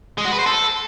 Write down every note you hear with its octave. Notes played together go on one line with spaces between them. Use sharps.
G#3
F#4
B4
C5
A4